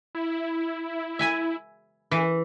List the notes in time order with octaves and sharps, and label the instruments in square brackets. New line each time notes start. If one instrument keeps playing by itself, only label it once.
[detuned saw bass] E4
[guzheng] E5 G#5 B5
E3